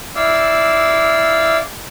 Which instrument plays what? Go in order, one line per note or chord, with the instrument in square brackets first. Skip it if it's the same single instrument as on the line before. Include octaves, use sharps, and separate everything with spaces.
[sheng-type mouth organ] E4 D5 F5 E6